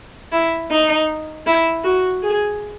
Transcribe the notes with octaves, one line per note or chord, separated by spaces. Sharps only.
E4
D#4
E4
F#4
G#4